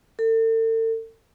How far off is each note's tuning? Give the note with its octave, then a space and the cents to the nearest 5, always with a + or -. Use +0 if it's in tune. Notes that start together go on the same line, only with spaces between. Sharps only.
A4 +40